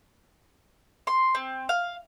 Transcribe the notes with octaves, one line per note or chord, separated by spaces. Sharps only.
C6
C4
F5